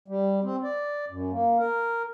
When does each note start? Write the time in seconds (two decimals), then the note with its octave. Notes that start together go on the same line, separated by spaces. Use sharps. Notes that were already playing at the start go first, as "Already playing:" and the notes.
0.08 G3
0.43 C4
0.63 D5
1.10 F#2
1.31 A#3
1.58 A#4